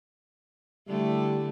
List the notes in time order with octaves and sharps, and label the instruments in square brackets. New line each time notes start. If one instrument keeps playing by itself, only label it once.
[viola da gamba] D3 A3 E4 [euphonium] G3